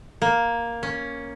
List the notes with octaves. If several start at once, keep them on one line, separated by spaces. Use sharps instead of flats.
A#3
C#4